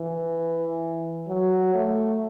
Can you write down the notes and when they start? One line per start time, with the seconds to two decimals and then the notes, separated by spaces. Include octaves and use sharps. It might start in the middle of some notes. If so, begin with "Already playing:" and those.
Already playing: E3
1.28 F#3
1.74 A3